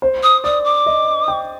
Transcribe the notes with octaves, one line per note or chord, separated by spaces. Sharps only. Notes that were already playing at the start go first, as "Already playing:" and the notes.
C5
D#6
D5 D#6
D6
D#5
G5